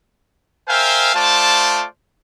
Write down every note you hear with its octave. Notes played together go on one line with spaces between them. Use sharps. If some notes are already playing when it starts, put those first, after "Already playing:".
A#4 C5 E5 F5 G5 G#5
A3 F4 C5 D5 A5